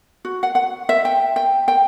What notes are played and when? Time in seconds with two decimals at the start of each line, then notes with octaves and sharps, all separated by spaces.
0.25 F#4
0.43 F#5
0.55 F#5
0.89 E5
1.05 G5
1.36 G5
1.68 G5